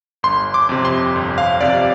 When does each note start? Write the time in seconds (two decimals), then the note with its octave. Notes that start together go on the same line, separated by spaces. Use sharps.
0.23 G1 C6
0.54 D6
0.69 F2 C3
0.85 C6
1.16 G1
1.38 F5
1.60 F2 C3 D5